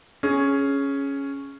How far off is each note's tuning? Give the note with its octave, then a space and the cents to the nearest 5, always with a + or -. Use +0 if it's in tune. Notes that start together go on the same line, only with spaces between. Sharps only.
C#4 +0 G#4 +10